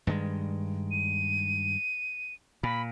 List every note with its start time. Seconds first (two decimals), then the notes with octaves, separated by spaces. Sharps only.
0.07 G2 D#3 G#3
0.91 D#7
2.63 A#2 B5